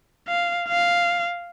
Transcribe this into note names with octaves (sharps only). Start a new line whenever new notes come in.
F5
F5